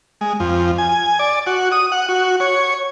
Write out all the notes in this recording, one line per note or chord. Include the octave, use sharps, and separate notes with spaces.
G#3
F2
G#5
D5
F#4
D#6
F#5
F#4
C#5